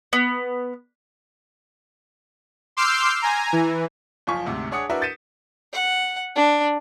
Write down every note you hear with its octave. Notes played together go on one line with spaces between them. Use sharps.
B3
C6 D6 E6 F6 G6 C7
G#5 A#5
E3
F#1 F3 F5 G#5 C#6 B6
D2 G#2 C3
D4 G#4 C#5 F#5 D#6 C#7
D4 E4 F#4 A#4 B4 E5
G6 A6 B6 C#7 D#7 E7
F#5
D4